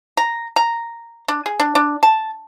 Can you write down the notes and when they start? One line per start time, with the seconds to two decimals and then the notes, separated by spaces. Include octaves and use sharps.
0.17 A#5
0.56 A#5
1.28 D4
1.46 G#4
1.60 D4
1.75 D4
2.03 A5